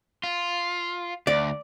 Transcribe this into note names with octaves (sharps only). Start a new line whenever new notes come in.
F4
D2 D5